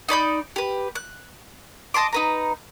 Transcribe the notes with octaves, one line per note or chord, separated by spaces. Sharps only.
D#4 D5 B5 G6
G4 B4
F#6
D#5 A5 C6 D6
D#4 B4 A#5